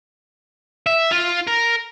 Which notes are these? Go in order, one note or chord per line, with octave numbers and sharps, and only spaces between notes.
E5
F4
A#4